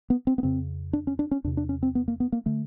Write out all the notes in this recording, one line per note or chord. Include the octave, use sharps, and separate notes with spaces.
B3
C4
B3
F2 C#3 C4
D4
C#4
D4
C#4
E2 C3 D4
D4
C#4
C4
B3
A#3
B3
A#3
D3 A3